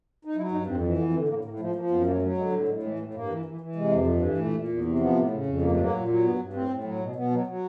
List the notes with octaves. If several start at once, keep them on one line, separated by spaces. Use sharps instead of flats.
D#4
F#3 E4
G2 D#4
F2 C4
E3
F2 B3
D3 C4
A2 A#3
A2 A#3
F3 A3
F3 A#3
F#2 B3
F#3 A#3
F#3 A3
D3 G#3
A2 G3
A2 G#3
E3 G#3
A2 A3
G2 A#3
E3
E3
E3
C3 G#3
F2
G2
E3
A#2 A3
A#2
E2
C3
F3 B3
A2
C#3
F2
G2 A#3
A3
F#3 A#3
A#2
F#3
G2 B3
G2
A2 C4
A2
F#3
B2
B2 B3
F#3
F#3